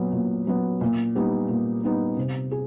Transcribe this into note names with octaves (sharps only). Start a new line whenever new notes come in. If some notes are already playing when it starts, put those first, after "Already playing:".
Already playing: A#2 F#3 B3
A#2
F#3 B3
A#2
G3 B3 D#4
A#2
G3 B3 D#4
C3
G#4